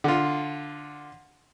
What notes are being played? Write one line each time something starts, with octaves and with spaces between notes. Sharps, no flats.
D3 F4